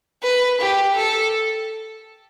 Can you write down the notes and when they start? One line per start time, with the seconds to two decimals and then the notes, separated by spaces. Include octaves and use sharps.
0.23 B4
0.61 G4
0.96 A4